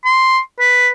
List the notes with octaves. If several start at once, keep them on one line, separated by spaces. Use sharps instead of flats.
C6
B4